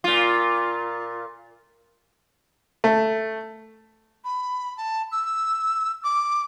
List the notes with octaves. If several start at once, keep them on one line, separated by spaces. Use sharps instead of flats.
A#2 F4
A3
B5
A5
E6
D6